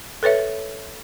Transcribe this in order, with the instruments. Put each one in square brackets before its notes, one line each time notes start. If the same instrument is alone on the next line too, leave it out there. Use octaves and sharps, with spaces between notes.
[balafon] A4 B4 C#5 E5